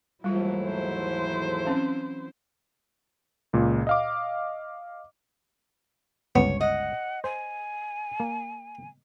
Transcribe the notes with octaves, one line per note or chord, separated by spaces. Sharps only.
D#2 G#2 E3 F#3 G3 A3 E4 F4
C5
C4 C#4 F5
C#2 A#2
D#5 F5 D6
G1 C#2 B3 C#5
D#5 F#5
C5 G#5
A#3